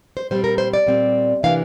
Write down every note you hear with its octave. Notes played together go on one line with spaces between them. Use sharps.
C5
A#2 G3 C4 C5
A#4
C5
D5
A#2 G3 C4
C3 E3 A#3 D4 F5